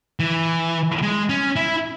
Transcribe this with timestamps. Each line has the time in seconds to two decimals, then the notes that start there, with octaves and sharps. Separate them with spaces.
0.20 E3
1.02 G#3
1.29 C#4
1.56 E4